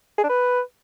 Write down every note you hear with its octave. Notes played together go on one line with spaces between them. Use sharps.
G#4
D4
B4